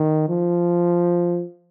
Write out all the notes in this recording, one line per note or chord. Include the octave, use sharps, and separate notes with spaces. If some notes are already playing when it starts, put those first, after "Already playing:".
Already playing: D#3
F3